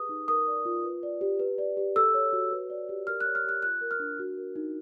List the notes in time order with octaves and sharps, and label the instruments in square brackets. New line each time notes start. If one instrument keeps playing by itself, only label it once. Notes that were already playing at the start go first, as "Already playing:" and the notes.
Already playing: [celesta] G4 G#4 B4 D#6
D#4
A#4 D#6
D5
F4
B4
D5
G4
B4
D5
G4
A4 E6
C#5
F#4
B4
D5
G4
A#4 F6
F#6
C#5
F6
G4 F#6
F4 F#6
A#4
F6
D4
F#4
A#4
D#4